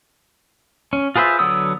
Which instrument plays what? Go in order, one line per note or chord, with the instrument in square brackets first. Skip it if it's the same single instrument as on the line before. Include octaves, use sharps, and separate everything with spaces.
[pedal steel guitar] C#4
F4 G#4 B4 C5 E5
D3 F#3 B3 D#6 E6